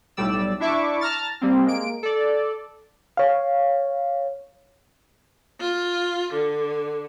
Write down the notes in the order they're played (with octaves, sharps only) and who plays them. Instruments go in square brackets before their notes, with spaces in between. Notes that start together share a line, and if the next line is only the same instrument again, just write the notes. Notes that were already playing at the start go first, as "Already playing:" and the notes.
[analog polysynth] B1 A2 G3 D5 E6
D4 E4 E5 C#6 D6
A5 A#5 F6 A6
G3 A#3 C4
G#3 A#3 D7
A4 D5
[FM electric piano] C#5 F5
[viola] F4
D3